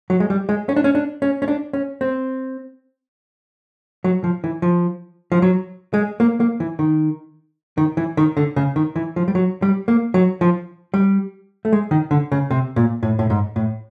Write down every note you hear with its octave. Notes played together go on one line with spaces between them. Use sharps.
F#3
G#3
G3
G#3
C#4
D4
C#4
D4
C#4
C#4
D4
C#4
C4
F#3
F3
E3
F3
F3
F#3
G#3
A#3
A#3
E3
D#3
D#3
E3
D#3
D3
C#3
D#3
E3
F3
G3
F#3
G3
A#3
F#3
F3
G3
A3
G#3
D#3
D3
C#3
C3
A#2
A2
A2
G#2
A2